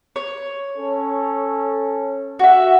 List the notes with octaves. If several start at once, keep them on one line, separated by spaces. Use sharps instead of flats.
C#5
C#4 A4
F#4 E5